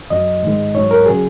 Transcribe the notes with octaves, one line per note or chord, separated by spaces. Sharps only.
F#2 F#3 D#5
G#2 D#3 G#3
G#2 F#3 C#5
A#4
C#3 F#3 G#4